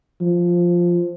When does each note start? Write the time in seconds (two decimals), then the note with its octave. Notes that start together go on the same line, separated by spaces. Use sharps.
0.21 F3